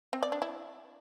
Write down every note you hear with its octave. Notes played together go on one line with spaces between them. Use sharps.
C4
D5
D4
E4